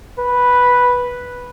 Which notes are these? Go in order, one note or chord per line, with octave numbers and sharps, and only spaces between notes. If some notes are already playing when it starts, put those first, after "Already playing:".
B4